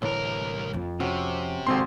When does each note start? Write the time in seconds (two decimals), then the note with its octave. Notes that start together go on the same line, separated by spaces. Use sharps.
0.02 C2 A2 D3 E3 A#4
0.73 F2 F3
1.00 C3 C4 C#4 F#4
1.67 G#1 G#2 C4 F#4 A4 C6